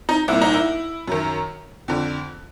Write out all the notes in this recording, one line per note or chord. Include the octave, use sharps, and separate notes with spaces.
D#4
C2 A#2 E4
D#4
E4
F#2 D#3
F2 D3